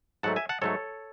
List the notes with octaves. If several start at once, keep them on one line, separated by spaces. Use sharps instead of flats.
G#2 F#3 A3 F#5 A5
E5 G#5
F#5 A5
G#2 F#3 A3 A4 C#5